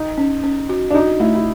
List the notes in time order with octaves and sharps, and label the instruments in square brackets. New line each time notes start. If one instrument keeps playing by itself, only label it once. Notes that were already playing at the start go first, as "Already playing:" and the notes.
Already playing: [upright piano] D#4
[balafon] C#4
C#4
F#4
[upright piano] D4
[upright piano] D#4 [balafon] F#4
[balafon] A3 [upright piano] E4
[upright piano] E4